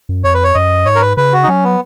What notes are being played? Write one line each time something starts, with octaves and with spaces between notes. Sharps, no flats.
F#2
F2 C#5
B4
C#5
F#2 D#5
G#2 C#5
A#4
B4
C#3 B4
F#4
D#4
F#3 C#4
B3